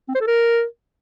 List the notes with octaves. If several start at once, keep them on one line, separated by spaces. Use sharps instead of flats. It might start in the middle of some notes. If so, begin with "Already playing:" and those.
C4
C5
A4
A#4